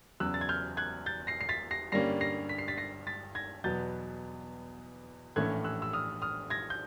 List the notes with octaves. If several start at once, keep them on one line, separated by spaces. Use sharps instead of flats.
E2 C#3 F#3 E6 F#6
A6
G#6
F6 G6
F#6 G#6
G6 A6
A#6 C7
C7
A6 B6
A#6 C7
G2 D3 G3 A#3 C#4 A#6 C7
A#6 C7
B6
C7
A6 B6
A#6 C7
A6 B6
G#6 A#6
E2 B2 F#3 B3 G6 A6
A#1 A2 E3 A3 C#4 F#6 G#6
E6 F#6
E6
D#6 F6
D#6 F6
G#6 A#6
G6